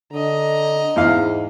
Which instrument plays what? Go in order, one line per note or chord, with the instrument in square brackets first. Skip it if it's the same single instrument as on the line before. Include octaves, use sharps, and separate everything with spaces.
[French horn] D3 [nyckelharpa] D#5 A#5
[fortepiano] E2 E4 F5 [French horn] G#2